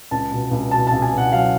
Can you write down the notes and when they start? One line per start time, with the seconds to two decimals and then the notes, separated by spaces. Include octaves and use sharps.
0.11 C#2 A5
0.32 B2
0.51 C#2
0.71 B2 A5
0.87 C#2 A5
1.02 G#5
1.13 B2 F#5
1.32 F#3 F5